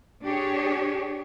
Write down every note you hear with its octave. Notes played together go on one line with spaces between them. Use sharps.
D4 G4 G#4 C#5